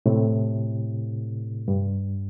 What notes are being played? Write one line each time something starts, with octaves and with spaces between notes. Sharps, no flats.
A2 C3
G2